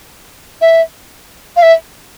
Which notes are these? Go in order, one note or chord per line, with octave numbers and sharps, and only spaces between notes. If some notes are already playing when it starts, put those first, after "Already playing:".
E5
F5
E5